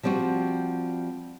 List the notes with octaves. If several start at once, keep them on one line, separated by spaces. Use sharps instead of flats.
F3 G3 C4 F4 F#4